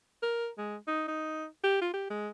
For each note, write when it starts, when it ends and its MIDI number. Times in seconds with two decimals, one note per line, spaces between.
0.23 0.49 70
0.58 0.76 56
0.88 1.04 63
1.08 1.46 63
1.63 1.78 67
1.81 1.90 65
1.94 2.07 67
2.10 2.29 56